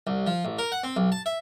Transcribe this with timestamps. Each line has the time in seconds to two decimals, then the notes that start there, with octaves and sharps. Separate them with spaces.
0.07 C2
0.27 F3
0.45 A1
0.59 A#4
0.72 F#5
0.84 C4
0.97 B1
1.12 A5
1.26 E5